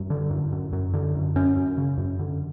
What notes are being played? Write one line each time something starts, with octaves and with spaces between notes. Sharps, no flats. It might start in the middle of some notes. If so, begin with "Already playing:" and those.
Already playing: F#2 G3
D3
F#2
F#2
F#2
D3
F#2
F#2 C#4
F#2
C#3
F#2
D3